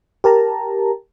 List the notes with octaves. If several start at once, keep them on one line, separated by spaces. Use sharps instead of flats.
G4 A#4 A5 A#5